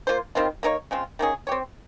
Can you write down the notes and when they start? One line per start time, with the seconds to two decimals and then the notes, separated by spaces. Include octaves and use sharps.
0.07 A#3 F4 C5
0.35 D#3 G3 C4 F4
0.63 A#3 D#4 A#4 C#5
0.91 C#3 G#3 C4 F4
1.19 D#3 A#3 C#4 G#4
1.47 C4 G4 C#5